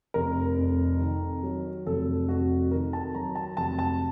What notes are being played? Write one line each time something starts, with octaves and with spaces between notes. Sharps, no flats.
F1 A#4
F2
D#3
F#3
F1 A4
F2 F#4
D#3 A#4
A5
F#3 A#5
A5
F1 A5
A5